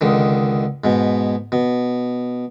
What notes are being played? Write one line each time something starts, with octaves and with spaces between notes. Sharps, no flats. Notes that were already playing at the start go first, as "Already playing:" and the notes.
C#2 D3 D#3
G#2 B2
B2